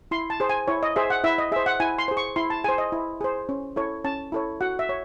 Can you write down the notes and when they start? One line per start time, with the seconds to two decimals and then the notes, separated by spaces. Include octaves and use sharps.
0.11 E4 C6
0.30 A5
0.40 G#4 C5
0.49 G#5
0.68 E4 C#5
0.83 D#5
0.96 G#4 C5 E5
1.10 F#5
1.24 E4 E5
1.38 D#5
1.52 G#4 C5 E5
1.66 F#5
1.80 E4 G#5
1.98 C6
2.08 G#4 C5
2.17 C#6
2.36 E4 C6
2.50 A5
2.64 G#4 C5 G#5
2.78 D#5
2.92 E4
3.21 G#4 C5
3.49 C#4
3.76 E4 A4 C#5
4.04 C#4 A5
4.32 E4 A4 C#5
4.61 F#4 F#5
4.79 E5
4.89 C#5